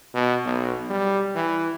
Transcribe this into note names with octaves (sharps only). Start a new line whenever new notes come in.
B2
B1
G3
E3